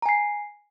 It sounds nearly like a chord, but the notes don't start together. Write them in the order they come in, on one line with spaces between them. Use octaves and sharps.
A#5 G#5 C7